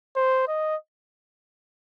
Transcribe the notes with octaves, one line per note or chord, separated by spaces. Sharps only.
C5
D#5